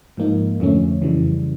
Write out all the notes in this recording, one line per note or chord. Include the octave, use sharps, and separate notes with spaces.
G#2 F3 A#3 D#4
F2 D3 F3 A3 C#4
F2 C#3 E3 G3